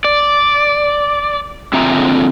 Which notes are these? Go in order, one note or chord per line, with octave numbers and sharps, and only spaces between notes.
D5
D3 C4 F4 G#4 E5 A#5